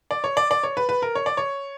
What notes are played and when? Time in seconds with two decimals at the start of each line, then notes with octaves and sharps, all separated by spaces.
0.11 D5
0.24 C#5
0.37 D5
0.51 D5
0.63 C#5
0.77 B4
0.89 B4
1.02 A#4
1.15 C#5
1.26 D5
1.37 C#5